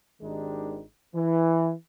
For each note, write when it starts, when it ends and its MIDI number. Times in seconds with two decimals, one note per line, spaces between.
0.21 0.82 32
0.21 0.82 51
0.21 0.82 56
0.21 0.82 62
0.21 0.82 63
0.21 0.82 67
1.15 1.73 52